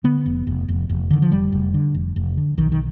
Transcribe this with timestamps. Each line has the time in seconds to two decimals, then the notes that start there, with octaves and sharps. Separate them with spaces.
0.04 D3 B3
0.26 F1
0.47 F1
0.68 F1
0.89 F1
1.10 D3 D#3
1.22 F3
1.31 F1 G3
1.52 F1
1.74 D3
1.95 F1
2.16 F1
2.37 D3
2.57 B1 D#3
2.72 D#3